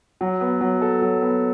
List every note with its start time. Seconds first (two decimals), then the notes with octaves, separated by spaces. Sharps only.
0.21 F#3
0.41 B3
0.61 F#3
0.82 A4
1.02 F#3
1.22 B3